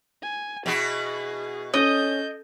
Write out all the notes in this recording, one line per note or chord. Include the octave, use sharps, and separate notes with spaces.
G#5
B2 E4 F#4 G#4
C#4 A4 D#5 G6